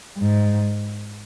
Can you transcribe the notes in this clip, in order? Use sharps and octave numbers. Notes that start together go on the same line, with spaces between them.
G#2